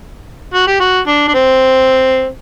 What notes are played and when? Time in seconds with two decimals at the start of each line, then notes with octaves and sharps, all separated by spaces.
0.54 F#4
0.68 G4
0.80 F#4
1.07 D4
1.28 D4
1.34 C4